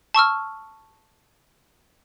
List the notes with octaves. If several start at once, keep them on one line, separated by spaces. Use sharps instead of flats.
A5 C#6 E6 F6